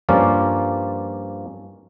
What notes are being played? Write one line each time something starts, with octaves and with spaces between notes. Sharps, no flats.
G2 F3 A#3 C#4 F4 D5